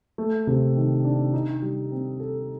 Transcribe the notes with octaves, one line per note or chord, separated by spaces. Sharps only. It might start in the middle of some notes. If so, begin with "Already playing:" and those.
A3
C3
D#3
D4
D#4
G3
C4
A4